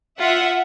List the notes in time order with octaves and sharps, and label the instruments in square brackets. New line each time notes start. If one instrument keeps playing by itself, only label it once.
[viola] F4 [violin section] E5 F#5